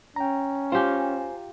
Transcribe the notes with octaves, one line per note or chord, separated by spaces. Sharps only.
C#4 G5 A#5
F4 G4 C5 G#5